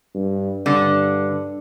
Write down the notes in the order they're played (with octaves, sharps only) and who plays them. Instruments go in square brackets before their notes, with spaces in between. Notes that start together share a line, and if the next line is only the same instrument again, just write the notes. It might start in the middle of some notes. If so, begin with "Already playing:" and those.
[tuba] G2
[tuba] G2 [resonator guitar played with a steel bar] D3